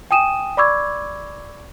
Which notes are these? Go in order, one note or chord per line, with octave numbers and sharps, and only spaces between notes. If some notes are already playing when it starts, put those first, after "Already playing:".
G5 G#5 D#6 D#7 E7
D5 B5 C#6 D6 E6 G#6